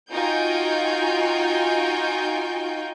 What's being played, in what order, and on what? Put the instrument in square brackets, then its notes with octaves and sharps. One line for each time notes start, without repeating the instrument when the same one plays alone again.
[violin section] D#4 F4 F#4 G5 G#5 G6